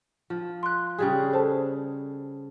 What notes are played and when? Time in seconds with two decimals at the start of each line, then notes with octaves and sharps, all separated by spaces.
0.30 F3
0.63 C6 F#6
0.98 C#3 G3 G#4
1.32 A4 C5 A5